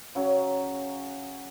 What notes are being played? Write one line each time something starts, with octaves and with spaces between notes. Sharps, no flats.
C#3 F#3 C#4